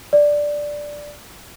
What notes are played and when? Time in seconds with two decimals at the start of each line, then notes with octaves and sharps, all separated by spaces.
0.13 D5